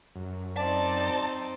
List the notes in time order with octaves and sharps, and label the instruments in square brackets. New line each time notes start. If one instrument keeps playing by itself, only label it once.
[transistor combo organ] F#2
[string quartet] C4 D#4 [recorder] D5 [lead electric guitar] A5